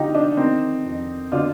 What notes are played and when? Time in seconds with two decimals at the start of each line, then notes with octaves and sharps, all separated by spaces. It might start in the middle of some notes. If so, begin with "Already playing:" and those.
Already playing: D3 D#4 F4 G4
0.15 D4
0.37 D#3 C4 D#4
0.85 F2
1.32 D3 D4 F4